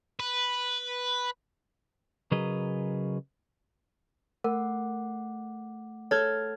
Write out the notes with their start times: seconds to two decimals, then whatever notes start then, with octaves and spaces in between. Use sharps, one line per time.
0.20 B4
2.32 C#3 F#3 G#4 A#4 B4 D#5
4.44 A3 A#4 F#5 D6
6.11 A4 C#5 F6 G#6